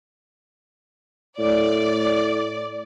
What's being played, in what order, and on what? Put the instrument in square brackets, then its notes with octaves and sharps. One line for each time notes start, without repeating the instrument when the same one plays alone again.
[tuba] A2 [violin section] D5